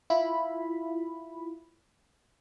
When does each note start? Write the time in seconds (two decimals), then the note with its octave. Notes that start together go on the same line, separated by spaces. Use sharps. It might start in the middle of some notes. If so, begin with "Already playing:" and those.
0.10 E4 F4 B5